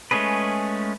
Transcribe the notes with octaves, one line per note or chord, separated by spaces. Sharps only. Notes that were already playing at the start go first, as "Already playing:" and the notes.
G#3 A3 C#4 G#4 B4